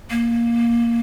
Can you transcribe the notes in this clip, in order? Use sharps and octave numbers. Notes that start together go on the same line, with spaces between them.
A#3